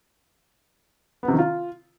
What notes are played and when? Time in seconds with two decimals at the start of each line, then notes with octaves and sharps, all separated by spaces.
1.23 B3
1.28 C3
1.33 D#3
1.39 F4